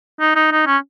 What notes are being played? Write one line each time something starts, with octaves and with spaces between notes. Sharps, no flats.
D#4
D#4
D#4
C#4